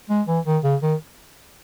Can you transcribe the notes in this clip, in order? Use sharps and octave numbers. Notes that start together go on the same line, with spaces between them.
G#3
E3
D#3
C#3
D#3